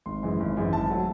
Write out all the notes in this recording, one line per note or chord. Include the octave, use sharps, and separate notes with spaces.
G#1 C6
F#2 E3 G#3
G#1
F#2 E3 G#3
G#1 A5
F#3 A3